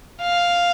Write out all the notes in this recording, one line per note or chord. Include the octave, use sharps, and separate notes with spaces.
F5